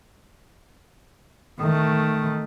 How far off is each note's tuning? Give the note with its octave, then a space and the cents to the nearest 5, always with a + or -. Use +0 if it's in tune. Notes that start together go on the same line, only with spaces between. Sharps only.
D#3 +0 A3 +0